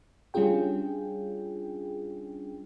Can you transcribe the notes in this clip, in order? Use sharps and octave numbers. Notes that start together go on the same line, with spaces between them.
G3 C#4 D4 F4 G#4 G5